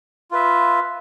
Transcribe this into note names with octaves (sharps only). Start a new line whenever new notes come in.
F4 B4 E5